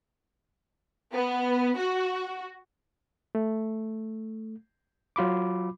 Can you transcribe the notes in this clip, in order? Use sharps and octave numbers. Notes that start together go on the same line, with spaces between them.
B3
F#4
A3
F#3 F4 B5 D6